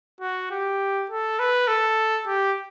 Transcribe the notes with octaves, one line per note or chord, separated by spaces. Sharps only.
F#4
G4
A4
B4
A4
G4